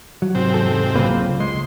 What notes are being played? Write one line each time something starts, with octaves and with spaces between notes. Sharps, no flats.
F#3
G#2 C3 C4
E2 A4
C#2 C#3 F#3 A#3 B4
G#3 C6